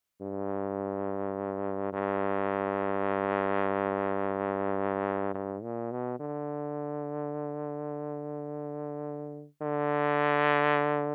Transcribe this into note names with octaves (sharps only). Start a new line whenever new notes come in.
G2
G2
G2
A#2
B2
D3
D3